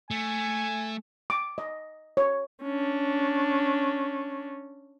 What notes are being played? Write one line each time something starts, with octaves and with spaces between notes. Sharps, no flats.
A3 G#5
D6
D#5
C#5
C#4 D4